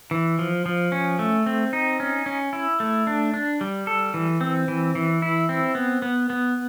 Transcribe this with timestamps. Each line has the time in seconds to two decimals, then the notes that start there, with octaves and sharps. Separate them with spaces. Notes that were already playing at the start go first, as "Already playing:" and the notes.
0.11 E3
0.39 F3
0.66 F3
0.92 C#4
1.19 A3
1.46 C4
1.73 D#4
2.00 C#4
2.26 C#4
2.53 E4
2.80 A3
3.07 D4
3.34 D4
3.61 G3
3.87 A4
4.14 E3
4.41 C4
4.68 E3
4.95 E3
5.22 E4
5.49 C4
5.75 B3
6.02 B3
6.30 B3